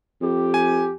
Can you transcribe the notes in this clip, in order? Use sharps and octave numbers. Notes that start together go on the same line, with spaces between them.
F2 G4
G#5